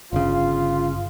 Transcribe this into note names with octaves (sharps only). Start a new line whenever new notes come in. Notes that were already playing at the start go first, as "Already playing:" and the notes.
G1 C#3 F4